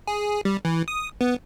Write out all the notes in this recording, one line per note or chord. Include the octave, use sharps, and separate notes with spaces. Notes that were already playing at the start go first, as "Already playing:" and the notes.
G#4
G3
E3
D#6
B3